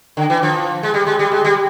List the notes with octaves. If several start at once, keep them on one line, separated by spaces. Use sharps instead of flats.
D3
E3
F3
G#3
G3
G#3
G3
G#3
G3